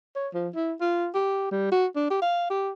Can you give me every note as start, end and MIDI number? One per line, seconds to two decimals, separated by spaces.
0.16 0.28 73
0.34 0.49 53
0.55 0.73 64
0.81 1.08 65
1.15 1.50 67
1.51 1.68 55
1.72 1.86 66
1.96 2.07 62
2.11 2.17 67
2.22 2.48 77
2.50 2.71 67